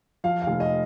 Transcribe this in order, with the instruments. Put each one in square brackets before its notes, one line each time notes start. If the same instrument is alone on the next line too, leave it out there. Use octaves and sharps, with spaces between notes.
[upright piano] F3 F5
F5
F1
D#5